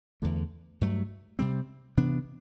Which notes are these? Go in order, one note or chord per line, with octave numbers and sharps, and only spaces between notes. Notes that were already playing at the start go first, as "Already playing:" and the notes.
E2 D3 A3
G2 F#3 A3
C3 G3 C4
C3 E3 B3 D4